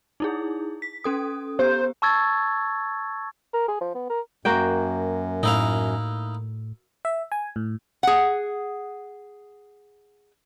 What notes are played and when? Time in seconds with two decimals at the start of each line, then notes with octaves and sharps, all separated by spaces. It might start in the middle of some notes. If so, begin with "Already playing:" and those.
0.20 D#4 E4 G#4
0.82 B6
1.04 C#4 A4 D#6
1.59 B3 G4 C5
2.02 A5 C#6 E6 G#6 A6
3.54 A#4
3.68 G#4
3.81 F3
3.95 B3
4.10 A#4
4.45 F#2 A#3 F#4 G5
5.43 A2 D#4 E4 F5
7.05 E5
7.32 G#5
7.56 A2
8.03 G#4 F#5